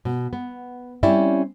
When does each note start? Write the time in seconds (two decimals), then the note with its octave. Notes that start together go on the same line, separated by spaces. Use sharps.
0.05 B2
0.33 B3
1.03 G3 C4 C#4 E4 D5 E5